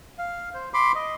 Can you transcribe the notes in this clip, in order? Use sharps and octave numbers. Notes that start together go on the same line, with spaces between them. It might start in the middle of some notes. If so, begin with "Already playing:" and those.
F5
C5
B5 C6 D6
D#5